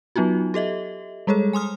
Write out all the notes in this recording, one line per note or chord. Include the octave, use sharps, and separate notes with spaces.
F#3 B3 D#4 F4 F#4
G4 A4 D#5 E5
G3 G#3 G#4 A4 C#5
G#5 C6 D#6 F6